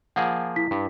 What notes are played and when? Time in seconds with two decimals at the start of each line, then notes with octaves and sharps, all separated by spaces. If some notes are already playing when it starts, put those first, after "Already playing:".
0.16 F3 A#3 G#4 F#5
0.56 E4 B6
0.71 G2